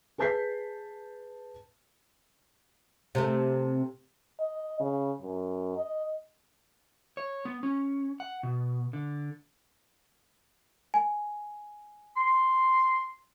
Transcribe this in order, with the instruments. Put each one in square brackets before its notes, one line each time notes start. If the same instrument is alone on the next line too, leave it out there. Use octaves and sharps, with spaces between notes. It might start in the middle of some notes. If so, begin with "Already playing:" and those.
[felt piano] G#4 B4 A5 G6 B6 C7
[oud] C3 A3
[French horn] D#5
C#3
F#2
D#5
[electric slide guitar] C#5
B3
C#4
F#5
B2
D3
[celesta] G#5
[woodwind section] C6